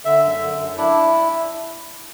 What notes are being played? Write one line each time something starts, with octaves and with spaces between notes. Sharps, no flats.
D3 E5
F#2
D3
F#2
D4 E4